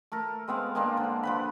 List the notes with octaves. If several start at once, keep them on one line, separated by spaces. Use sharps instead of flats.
A3 A4 A#4
G#3 B3 C4 F5
G#3 A#3 C4 D4
D3
F3 B4 B5